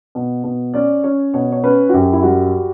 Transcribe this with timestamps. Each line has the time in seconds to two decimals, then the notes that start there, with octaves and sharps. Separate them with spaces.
0.15 B2
0.44 B2
0.74 C#4 D5
1.04 C#4 C#5
1.34 B2 C#5
1.52 C#5
1.64 C#4 B4
1.89 F#4
1.94 F#2 G4
2.13 E4
2.22 G3 F#4